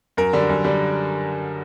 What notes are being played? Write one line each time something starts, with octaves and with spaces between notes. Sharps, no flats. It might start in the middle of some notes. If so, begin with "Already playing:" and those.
F#2 A#4
D3 G3
F#2
D3 G3